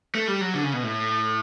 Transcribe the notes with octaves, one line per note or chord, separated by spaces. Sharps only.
A3
G3
F#3
D3
C#3
B2
A2